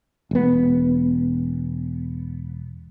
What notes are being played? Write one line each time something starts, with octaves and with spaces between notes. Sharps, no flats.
E1 B3